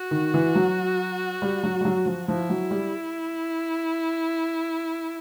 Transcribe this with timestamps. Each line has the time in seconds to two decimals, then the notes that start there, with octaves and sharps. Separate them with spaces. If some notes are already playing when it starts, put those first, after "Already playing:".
Already playing: F#4
0.11 D#3
0.34 E3
0.55 F#3
1.42 G3
1.63 F#3
1.81 G3
1.85 F#3
2.06 F3
2.28 F3 E4
2.50 F#3
2.71 G3